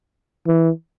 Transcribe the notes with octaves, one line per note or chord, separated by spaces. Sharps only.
E3